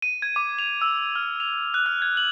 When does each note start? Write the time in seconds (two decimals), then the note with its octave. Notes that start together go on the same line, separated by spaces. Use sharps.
0.02 D#7
0.22 G#6
0.36 D6
0.59 F7
0.81 E6
1.16 F6
1.40 F7
1.74 F#6
1.86 F6
2.02 G#6
2.17 F#7